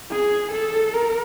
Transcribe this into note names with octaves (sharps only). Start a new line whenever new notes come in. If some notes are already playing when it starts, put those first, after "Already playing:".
G#4
A4
A#4